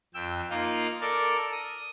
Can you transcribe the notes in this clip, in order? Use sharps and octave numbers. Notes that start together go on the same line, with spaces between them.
F2 G5 E6
A#3 D#4 F4
A4 A#4 D5
D#6